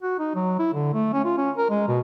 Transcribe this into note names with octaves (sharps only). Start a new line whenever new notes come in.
F#4
D#4
F#3
E4
D3
A3
C#4
F4
C#4
A#4
G#3
B2